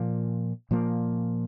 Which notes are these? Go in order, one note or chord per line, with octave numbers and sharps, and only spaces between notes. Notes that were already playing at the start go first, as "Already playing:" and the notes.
Already playing: A#2 F3 A#3
A#2 F3 A#3